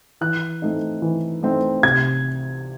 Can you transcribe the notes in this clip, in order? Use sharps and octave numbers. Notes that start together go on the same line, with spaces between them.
E3 F#6
A3 C4 D#4
E3
A3 C4 D#4
C3 G#6